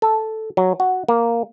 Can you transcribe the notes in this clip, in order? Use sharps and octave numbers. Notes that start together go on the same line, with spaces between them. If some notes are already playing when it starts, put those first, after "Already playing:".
A4
F#3
F#4
A#3